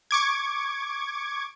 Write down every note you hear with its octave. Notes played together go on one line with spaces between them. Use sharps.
C#6 D6 G#6